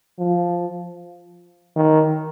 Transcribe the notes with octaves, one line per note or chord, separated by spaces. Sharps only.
F3
D#3